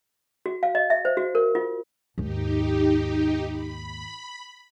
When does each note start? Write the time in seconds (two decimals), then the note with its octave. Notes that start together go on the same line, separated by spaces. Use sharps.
0.46 F#4
0.63 F5
0.75 D#5
0.90 E5
1.05 C5
1.17 F#4
1.35 A#4
1.55 F4
2.18 D#2 G#2 D#4 G4
3.49 B5